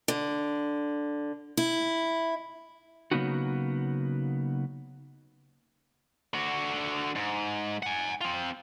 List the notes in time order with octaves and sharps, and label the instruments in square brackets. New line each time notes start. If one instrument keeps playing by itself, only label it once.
[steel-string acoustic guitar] D3
E4
[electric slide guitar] C#3 F#3 A#3 B3 D#4 F#4
[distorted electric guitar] D3 F#4
G#2
F#5 G#5
C4 F4